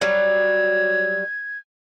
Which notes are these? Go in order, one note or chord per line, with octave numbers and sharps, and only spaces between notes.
F#3 G3 G#6